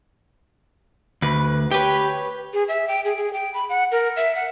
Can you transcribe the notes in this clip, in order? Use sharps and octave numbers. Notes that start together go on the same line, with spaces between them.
D2 B4
G4 B4 C#5
G#4
E5
G5
G#4
G#4
G5
B5
F#5
A#4
E5
F#5